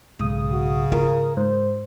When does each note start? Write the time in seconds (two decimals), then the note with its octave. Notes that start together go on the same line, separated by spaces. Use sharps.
0.19 B1 G#2 C#3 D#6
0.52 F#4
0.92 F4 A#4
1.37 G#2 C5